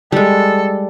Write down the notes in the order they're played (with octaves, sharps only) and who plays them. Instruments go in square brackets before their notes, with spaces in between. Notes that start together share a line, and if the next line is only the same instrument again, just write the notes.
[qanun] G3 G#3 [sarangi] A4